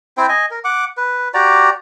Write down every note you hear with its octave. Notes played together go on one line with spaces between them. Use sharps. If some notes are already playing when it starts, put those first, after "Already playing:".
C4 E4 C5 G5
D#5 G#5
A#4
F#5 D6
B4
F#4 G4 D5 A#5